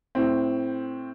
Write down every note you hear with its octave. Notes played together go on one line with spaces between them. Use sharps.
A2 C4